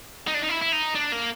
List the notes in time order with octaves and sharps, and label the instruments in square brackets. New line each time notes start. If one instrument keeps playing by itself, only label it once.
[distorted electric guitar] D#4
D4
D#4
E4
E4
D#4
D4
A#3